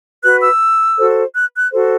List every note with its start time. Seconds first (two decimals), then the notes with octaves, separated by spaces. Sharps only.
0.22 F#4 B4 F#6
0.41 E6
0.97 F#4 A4 C5
1.34 F#6
1.56 F#6
1.71 F#4 A4 C5